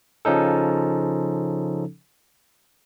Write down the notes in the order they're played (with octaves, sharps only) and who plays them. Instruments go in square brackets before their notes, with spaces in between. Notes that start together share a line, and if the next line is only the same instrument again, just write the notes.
[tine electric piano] C#3 F3 C#4 D#4 A4